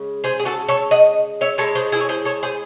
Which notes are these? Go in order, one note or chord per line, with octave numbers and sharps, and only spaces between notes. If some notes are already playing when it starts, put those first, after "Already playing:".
Already playing: C#3 G#3
G#4 C5
G#4
F#4 A4
A4 C#5
D#5 F#5
C#5 E5
A2 G#3 A4 C#5
G#4 C5
E4 G#4
C#5
G#4 C5
A4 C#5
G#4 C5